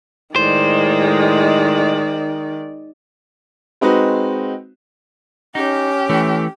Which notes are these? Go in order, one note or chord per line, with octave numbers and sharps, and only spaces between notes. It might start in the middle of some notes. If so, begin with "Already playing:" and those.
A2 D#3 G#3 C5 D5
G#3 C4 D#4 F#4 B4
C#4 D#4 G4
E3 A3